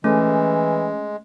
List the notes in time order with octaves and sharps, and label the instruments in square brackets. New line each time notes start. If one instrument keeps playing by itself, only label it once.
[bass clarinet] E3 [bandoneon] G#3 [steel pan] A3 [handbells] C#4